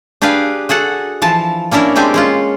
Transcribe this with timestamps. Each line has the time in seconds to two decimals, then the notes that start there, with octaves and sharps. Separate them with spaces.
0.22 D4 G4 G#4 B4 F5
0.69 F#4 G#4 A4 F#5
1.22 E3 F3 A5
1.71 A#3 C#4 D4 E4 A#4
1.96 G#3 C4 D4 G4 G#5
2.14 G#3 C#4 F4